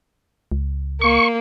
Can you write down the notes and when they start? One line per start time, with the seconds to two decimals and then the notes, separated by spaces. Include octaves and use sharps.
0.52 C#2
1.01 A#3 C#6